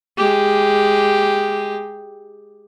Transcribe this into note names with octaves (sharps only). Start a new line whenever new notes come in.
G#3 G4